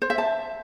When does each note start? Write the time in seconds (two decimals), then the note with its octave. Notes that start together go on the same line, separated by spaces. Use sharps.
0.02 C5
0.10 E5
0.18 A5